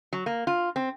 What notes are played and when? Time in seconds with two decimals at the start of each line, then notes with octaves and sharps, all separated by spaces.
0.13 F#3
0.26 A#3
0.47 F4
0.76 C4